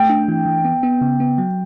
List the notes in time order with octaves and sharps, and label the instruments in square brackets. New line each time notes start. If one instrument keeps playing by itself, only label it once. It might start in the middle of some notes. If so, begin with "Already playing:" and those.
Already playing: [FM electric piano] A3 [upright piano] G5
[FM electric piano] D4
E3
E3
B3
B3
C#3
B3
F#3